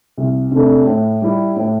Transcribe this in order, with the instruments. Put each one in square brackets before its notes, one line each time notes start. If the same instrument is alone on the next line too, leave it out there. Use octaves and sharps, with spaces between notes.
[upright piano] C2
C3 A3 D4
A2
G3 E4
A2